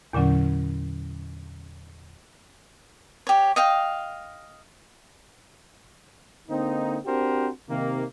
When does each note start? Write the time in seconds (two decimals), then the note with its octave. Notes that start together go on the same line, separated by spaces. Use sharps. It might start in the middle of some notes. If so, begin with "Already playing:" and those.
0.13 E2 A#2 D3 F#3 C#4
3.27 G4 C#5
3.56 D#5 F5 G5
6.49 D3 A#3 C4 D#4
7.05 C4 D4 F#4 G4 A#4 C5
7.69 C3 D#3 A#3